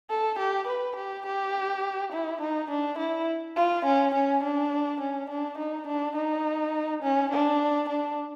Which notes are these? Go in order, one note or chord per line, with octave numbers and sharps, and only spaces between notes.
A4
G4
B4
G4
G4
E4
D#4
D4
E4
F4
C#4
C#4
D4
C#4
D4
D#4
D4
D#4
C#4
D4
D4